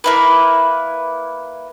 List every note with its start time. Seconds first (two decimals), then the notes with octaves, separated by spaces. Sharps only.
0.04 A#3 E4 B4